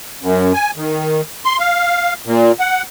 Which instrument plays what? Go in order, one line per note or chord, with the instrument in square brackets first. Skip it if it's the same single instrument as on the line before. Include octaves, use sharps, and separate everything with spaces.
[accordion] F#2
G#5
D#3
C6
F5
A#2
F#5